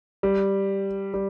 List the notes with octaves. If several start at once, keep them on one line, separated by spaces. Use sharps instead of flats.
G3
G3